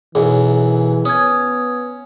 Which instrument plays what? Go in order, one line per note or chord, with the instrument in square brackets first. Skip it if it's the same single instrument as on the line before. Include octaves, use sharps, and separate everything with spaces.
[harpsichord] B1 F#2 [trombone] E3 [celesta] G#4
[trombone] B3 [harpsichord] C#4 [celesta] D#6 G#6